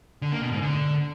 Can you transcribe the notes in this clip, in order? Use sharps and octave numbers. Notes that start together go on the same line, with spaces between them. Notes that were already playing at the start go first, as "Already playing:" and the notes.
D3
A#3
B2
G#2
D3